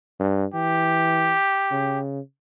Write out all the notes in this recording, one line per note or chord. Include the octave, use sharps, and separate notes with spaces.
G2
E3 G4
C#3